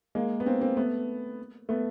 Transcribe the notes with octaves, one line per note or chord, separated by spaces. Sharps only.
G#3 A#3
B3
A#3 C4
A#3 C4
A3 B3
A3 B3